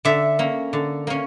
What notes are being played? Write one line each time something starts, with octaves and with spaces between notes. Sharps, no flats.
D3 E5
A#3 C#4
D3
A#3 C#4